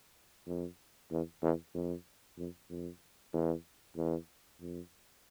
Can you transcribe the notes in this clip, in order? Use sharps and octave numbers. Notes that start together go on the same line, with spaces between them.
F2
E2
E2
F2
F2
F2
E2
E2
F2